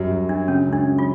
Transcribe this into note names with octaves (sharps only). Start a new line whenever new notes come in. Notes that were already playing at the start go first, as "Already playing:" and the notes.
Already playing: F#2 F#3 G3
F#2
F#3 D4
C#3 C#4
C#2
D4
F#3
F4